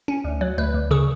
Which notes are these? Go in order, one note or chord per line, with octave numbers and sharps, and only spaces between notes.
C#4
D2
F#3
D2 B4
D2
C#3 G#4